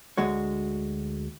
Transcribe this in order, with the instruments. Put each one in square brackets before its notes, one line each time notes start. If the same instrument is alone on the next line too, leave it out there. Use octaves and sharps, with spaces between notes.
[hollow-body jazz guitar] D2 D3 G#3 F#4 C#5